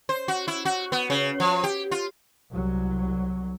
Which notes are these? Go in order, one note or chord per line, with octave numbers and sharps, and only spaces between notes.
C5
F#4
E4
F#4
B3
C#3
F3
G4
F4
C2 F#3